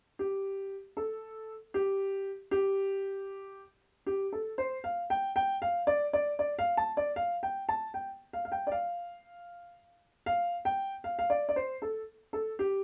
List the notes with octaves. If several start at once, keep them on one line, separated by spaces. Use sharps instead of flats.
G4
A4
G4
G4
G4
A4
C5
F5
G5
G5
F5
D5
D5
D5
F5
A5
D5
F5
G5
A5
G5
F5
F5
G5
D5
F5
F5
G5
F5
F5
D5
D5
C5
A4
A4
G4